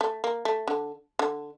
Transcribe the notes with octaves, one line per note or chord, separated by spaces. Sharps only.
A3
A#3
A3
D3
D3